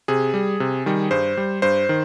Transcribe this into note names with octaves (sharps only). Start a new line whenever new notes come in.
C3 G#4
G3
C3
D#3 G3
G2 C5
G3
G2 C5
D#3